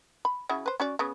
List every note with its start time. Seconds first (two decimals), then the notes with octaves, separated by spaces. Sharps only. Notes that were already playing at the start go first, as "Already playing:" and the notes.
0.25 B5
0.49 C#3 E4 F#4
0.66 B4 C5
0.80 C#4 F#4 D5
0.99 C#3 B3